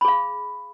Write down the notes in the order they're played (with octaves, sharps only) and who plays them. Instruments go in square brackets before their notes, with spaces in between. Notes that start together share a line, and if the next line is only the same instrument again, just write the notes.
[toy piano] B5
G#4
F5